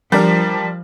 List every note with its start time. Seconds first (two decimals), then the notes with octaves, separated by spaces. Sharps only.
0.12 F3 G3 D4 A#4